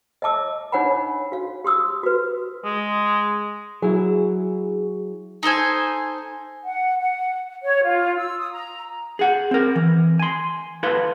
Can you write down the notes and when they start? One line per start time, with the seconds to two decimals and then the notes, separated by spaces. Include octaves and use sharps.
0.22 D#5 E5 A5 D6 E6
0.72 D4 D#4 C#5 F#5 G#5 B5
1.32 F#4 F5
1.64 G4 C6 D#6 E6
2.03 F#4 B4
2.65 G#3
3.82 F#3 E4 G#4
5.43 D#4 A4 C5 G#5
6.65 F#5
6.99 F#5
7.64 C#5
7.84 F4
8.17 E6
8.39 D#6
8.52 A#5
9.19 G#4 F#5
9.51 C4 A#4
9.76 E3
10.19 G#5 C6
10.83 E4 A4 B4 F5 C6